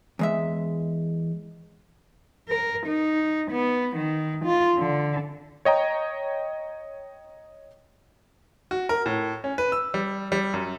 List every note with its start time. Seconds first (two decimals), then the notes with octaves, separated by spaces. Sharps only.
0.19 E2 G#3 E5
2.49 A#4
2.87 D#4
3.51 B3
3.97 D#3
4.45 F4
4.78 D3
5.65 C#5 D#5 G5 A#5
8.71 F#4
8.89 A#4
9.06 A2
9.44 C#4
9.58 B4
9.72 E6
9.94 G3
10.32 G3
10.54 F#2